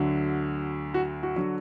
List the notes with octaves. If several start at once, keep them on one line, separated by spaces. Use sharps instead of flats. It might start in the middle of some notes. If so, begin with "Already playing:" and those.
Already playing: D2 D3 F#3
F#4
F#4
D3 F#3